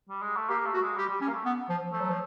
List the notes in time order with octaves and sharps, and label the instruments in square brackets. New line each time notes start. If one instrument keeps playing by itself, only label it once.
[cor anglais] G3
G#3
A3
[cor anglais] A#3 [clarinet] G4
[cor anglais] A3
[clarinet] F#4
[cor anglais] G#3
[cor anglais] G3 [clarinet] G4
[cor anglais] G3
[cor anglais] G3 [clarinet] C#4
[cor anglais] A#3
A3
[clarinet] B3
F3
[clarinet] F3 [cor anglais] A3
[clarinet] F#3
F3